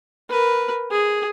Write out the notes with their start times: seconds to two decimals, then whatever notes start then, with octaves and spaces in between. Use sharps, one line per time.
0.30 A#4 B4
0.91 G#4